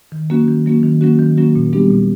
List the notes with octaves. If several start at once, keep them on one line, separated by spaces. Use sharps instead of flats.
D#3
F#3 A#3 C#4 F#4
D#3
F#3 A#3 C#4 F#4
D#3
F#3 A#3 C#4 F#4
D#3
F#3 A#3 C#4 F#4
A#2
G3 B3 D4 G4
A#2